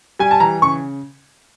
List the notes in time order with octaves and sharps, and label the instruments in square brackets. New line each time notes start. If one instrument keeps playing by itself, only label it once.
[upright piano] G3 G#5
A5
E3 A#5
C#3 C#6